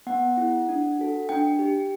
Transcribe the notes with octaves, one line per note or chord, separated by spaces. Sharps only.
B3 F#5
E4 G#4
D4
F#4 A4
D4 G5
G4